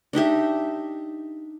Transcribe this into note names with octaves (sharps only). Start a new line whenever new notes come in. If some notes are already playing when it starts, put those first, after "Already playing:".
D4 D#4 G4 E5